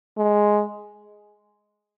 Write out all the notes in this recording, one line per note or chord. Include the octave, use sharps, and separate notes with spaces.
G#3